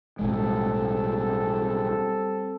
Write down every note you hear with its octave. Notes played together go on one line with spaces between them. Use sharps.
B1 A2 G3 G#3 C4 A4